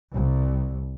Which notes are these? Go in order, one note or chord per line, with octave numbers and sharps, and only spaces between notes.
C2